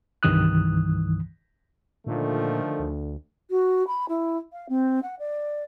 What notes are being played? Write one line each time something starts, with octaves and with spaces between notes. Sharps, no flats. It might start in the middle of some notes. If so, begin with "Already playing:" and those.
C2 G2 D#3 E3 D#6 F#6
A#2 D3 D#3 F3 A3
D2
F#4
B5
E4
F5
C4
F#5
D5